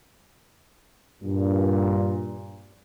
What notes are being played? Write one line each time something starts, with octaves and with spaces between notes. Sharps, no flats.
G2 A#2